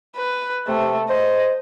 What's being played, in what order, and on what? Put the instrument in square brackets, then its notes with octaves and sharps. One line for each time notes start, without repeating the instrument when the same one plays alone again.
[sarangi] B4
[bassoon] C3 [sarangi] A3
[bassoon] C5 [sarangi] D#5